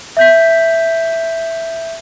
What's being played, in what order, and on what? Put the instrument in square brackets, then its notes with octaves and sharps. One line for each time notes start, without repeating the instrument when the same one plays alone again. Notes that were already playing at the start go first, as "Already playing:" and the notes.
[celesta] E5 G6 B6